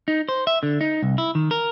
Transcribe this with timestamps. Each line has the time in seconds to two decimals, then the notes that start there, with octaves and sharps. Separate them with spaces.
0.08 D#4
0.29 C5
0.47 E5
0.63 D3
0.81 D#4
1.03 C2
1.18 E4
1.35 D#3
1.51 A#4